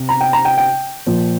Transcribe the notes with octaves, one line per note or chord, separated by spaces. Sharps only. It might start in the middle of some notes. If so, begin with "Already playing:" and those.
Already playing: C3
A#5
G5
A#5
G5
G5
A#2 F3